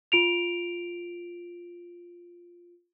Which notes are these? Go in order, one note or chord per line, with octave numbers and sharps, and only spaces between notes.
F4 D7 F7